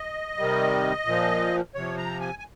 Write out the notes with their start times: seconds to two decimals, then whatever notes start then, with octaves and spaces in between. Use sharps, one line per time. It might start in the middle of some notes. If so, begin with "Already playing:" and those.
Already playing: D#5
0.37 C3 D#3 G3
1.06 A#2 F3
1.75 C3 F3 C#5
1.97 A#5
2.21 G#5
2.39 G#5